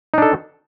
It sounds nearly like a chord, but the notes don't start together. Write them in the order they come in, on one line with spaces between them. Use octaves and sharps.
D#4 D4 A4